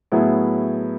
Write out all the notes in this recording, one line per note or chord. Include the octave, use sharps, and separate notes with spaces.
A2 F#3 B3 E4 G#4